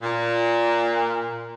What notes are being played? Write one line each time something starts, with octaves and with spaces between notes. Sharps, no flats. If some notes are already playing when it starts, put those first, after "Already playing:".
A#2